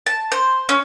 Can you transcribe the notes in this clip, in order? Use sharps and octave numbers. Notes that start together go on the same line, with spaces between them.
A5
C5
C#4